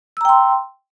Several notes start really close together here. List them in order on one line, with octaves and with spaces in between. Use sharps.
E6 A#5 G5 C6